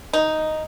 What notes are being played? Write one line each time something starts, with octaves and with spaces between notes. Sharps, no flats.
D#4